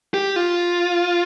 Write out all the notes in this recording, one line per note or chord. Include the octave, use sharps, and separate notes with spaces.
G4
F4